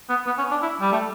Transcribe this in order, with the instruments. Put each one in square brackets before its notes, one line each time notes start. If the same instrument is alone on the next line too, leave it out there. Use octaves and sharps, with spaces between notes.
[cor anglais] B3
B3
C#4
D4
E4
G3
A3